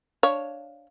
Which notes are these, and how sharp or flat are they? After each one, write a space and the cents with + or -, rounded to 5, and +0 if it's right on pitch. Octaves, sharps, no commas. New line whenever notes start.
D4 +0 C#5 +0 F5 +0